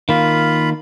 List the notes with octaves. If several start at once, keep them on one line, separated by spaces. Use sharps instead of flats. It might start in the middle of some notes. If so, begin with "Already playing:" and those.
D#3 A#3 F4 F5 B5